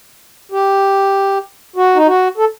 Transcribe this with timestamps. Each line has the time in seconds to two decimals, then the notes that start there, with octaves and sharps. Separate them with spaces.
0.52 G4
1.76 F#4
1.96 D#4
2.07 F#4
2.38 A4